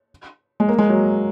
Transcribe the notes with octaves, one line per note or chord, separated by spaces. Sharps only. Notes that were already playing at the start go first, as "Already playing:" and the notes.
G#3
A#3
G#3
F#3